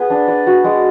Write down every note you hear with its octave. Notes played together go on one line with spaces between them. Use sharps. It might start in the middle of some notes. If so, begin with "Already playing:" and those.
Already playing: B3 G#4 B4
D4
D5
F#4
G#3